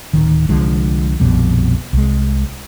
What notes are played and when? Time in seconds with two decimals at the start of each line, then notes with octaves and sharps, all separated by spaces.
0.13 D1 D#3
0.49 C2 D3 F3 G#3
1.20 A#1 F2 B2 G3
1.93 C2 G#3